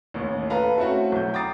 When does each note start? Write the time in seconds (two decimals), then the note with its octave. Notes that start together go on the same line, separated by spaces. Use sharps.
0.14 A1 D#2
0.50 A4 B4 F5 A#5
0.78 A3 C4 C#4 E4 F#4 A4
1.12 B1 G6
1.34 G5 A#5 D6 D#6 A6 C7